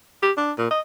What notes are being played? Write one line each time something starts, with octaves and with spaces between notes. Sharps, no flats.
G4
D4
A#2
D#5